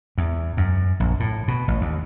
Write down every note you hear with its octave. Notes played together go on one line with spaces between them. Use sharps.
E2
F#2
A#1
A2
B2
A1
D#2